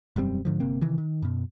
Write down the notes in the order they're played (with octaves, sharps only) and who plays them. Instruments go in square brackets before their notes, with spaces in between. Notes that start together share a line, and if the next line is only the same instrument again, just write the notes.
[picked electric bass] E1 F#2 G3 C4
G#2 D3 F3
G1 C3 A#3 C4
C3 D#3 E3
D#3
F#2 B2